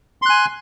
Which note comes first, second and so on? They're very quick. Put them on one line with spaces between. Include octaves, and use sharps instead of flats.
C6 F#6 G#5